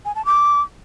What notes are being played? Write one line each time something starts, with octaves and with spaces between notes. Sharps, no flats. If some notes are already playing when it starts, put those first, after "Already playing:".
G#5
A5
D6